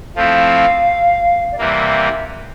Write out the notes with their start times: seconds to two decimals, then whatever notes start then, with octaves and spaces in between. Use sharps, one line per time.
0.15 F3 A3 C4 E4 F5
1.52 D5
1.58 C3 E3 G3 A#3 E5